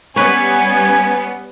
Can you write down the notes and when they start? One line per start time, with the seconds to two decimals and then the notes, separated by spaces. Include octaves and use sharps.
0.16 G3 B3 C#4 B4 C#5 G#5